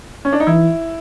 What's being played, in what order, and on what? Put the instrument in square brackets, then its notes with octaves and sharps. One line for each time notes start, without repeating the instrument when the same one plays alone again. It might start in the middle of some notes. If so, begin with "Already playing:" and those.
[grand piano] C#4
D4
D#4
[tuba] E3 [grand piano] E4